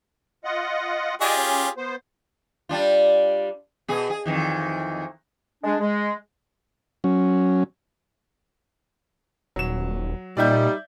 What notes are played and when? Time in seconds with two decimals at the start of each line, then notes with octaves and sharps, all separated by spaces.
0.44 F4 D#5 F#5
1.21 F4 G4 G#4 D5 D#5 G#5
1.36 C#4
1.77 B3 C5
2.69 G3 D4 F4
3.88 B2 G#4
4.10 G#4
4.26 F2 D#3 E3
5.64 G#3 D4
5.80 G#3
7.04 F#3 C#4
9.56 D#1 F#3 E7
10.37 A#2 G3 D#4 D5 E5 G6